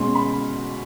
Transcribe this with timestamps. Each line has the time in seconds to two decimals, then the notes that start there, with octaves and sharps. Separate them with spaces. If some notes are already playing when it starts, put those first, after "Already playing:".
Already playing: B2 G#3 C#4 C6
0.15 B5